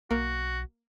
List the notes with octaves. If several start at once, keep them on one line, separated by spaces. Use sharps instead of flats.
B1 A#3 F#4